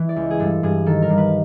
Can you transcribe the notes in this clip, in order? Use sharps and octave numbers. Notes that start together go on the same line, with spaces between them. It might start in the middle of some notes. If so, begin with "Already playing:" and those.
Already playing: E3
D5
C#2
G#4
G2 A4
G2 G#4
D#3 A4
A#4
G2
B4